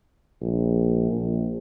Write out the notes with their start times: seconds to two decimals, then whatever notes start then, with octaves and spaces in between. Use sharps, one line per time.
0.41 A#1
1.11 A#1